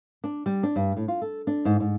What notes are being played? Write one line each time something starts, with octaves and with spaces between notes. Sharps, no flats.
D4
G3
D4
G2
A2
F4
A4
D4
G#2
G#2